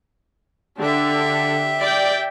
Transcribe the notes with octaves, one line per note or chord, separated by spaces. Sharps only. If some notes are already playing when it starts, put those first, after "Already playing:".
D3 G4 E5
D5 G5